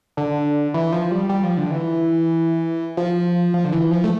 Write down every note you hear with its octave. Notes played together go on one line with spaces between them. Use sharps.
D3
E3
F3
G3
G3
F3
D3
E3
F3
F3
D3
E3
F3
A3